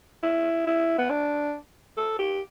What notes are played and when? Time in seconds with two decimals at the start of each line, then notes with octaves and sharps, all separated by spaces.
0.23 E4
0.67 E4
0.98 B3
1.10 D4
1.97 A4
2.19 G4